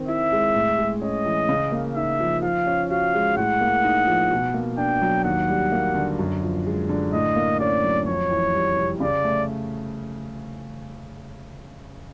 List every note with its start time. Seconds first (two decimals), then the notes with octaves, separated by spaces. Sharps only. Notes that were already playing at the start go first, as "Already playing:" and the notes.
Already playing: D#3 C4
0.08 E4 E5
0.32 G#3
0.55 A2
0.79 G#3
1.02 C#4 D#5
1.26 E3
1.49 C#3
1.72 A#3
1.96 D#4 E5
2.20 F3
2.42 F3 F5
2.67 C#4
2.90 F#4 F5
3.14 G#3
3.36 A2 F#5
3.61 A#3
3.84 D#4
4.07 F3
4.31 B2
4.54 A#3
4.77 D4 G5
5.02 F#3
5.24 D#2 F#5
5.48 G3
5.72 A#3
5.95 D3
6.19 F#2
6.42 F3
6.66 G#3
6.89 D3
7.13 A2 D#5
7.36 A#3
7.60 C#4 D5
7.84 F#3
8.07 F2 C#5
8.31 E3
8.54 G3
8.77 C3
9.00 C#3 D5
9.24 A3